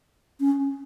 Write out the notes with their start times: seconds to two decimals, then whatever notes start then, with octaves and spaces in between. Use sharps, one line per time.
0.40 C#4